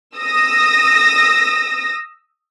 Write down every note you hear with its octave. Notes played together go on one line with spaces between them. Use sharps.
D#6 E6 A#6